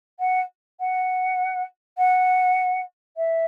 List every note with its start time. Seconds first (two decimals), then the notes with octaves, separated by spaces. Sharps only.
0.20 F#5
0.80 F#5
1.98 F#5
3.17 E5